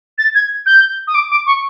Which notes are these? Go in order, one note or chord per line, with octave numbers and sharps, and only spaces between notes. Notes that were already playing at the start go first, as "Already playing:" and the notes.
A6
G#6
G6
D#6
D6
D6
C#6